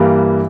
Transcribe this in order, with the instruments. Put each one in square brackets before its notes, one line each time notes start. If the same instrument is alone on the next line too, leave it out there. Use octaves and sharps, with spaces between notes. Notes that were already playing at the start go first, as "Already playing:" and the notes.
Already playing: [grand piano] G2 E3 G3 A#3